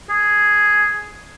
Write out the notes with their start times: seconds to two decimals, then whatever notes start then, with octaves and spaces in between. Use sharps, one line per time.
0.10 G#4